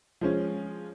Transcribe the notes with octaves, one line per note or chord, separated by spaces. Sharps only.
F3 G#3 C#4